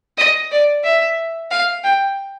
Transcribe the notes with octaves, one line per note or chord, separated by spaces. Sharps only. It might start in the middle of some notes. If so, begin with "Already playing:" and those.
D#5
D5
E5
F5
G5